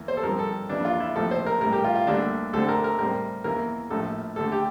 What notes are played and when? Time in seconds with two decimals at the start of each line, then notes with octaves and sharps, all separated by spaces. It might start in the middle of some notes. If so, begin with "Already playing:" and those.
Already playing: E2 A#3
0.08 C5
0.17 A4
0.23 G2 F3 C4 A#4
0.39 A4
0.69 F2 E3 A#3 D4
0.85 F4
1.00 E4
1.15 A#1 A#2 F3 A3 C4 A4
1.31 C5
1.46 A#4
1.61 A2 E3 G3 A#4
1.73 G4
1.84 F4
1.96 F4
2.07 D2 D3 G3 A#3 D4
2.53 D2 D3 A3 C4 A4
2.69 A#4
2.84 A#4
2.98 A2 G3 C4 A#4
3.44 E2 E3 A#3 A#4
3.90 A#1 A2 F3 A#3 A4
4.36 D2 D3 A3 A4
4.52 G4